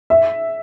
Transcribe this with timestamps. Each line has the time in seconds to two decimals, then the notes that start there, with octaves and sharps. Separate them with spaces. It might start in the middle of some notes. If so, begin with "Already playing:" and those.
0.10 E5